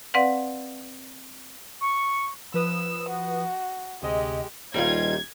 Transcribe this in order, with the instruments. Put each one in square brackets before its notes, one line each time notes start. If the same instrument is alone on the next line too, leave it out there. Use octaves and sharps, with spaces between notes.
[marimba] C4 B4 D5 F5 F#5
[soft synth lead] C#6
[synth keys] F3 B4 D#6 [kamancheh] E6
[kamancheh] F#4
[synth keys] D2 C3 D#5 [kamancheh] G#3 G4
[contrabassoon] D#1 [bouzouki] G3 D#4 F4 [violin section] G#6